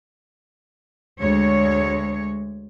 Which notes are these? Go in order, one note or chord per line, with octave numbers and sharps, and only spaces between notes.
D2 G#3 C#5